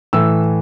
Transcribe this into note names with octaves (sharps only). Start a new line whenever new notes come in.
A2 E3 A3 E6